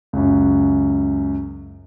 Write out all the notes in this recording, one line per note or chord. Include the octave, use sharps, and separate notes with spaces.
C#2 F#2